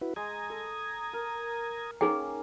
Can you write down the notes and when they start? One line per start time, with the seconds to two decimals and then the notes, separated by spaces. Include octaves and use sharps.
0.01 E4 F#4 B4
0.16 G#3 A#5 D#6 G#6
0.50 A4
1.13 A#4
2.01 A#3 C#4 D#4 G#4 G5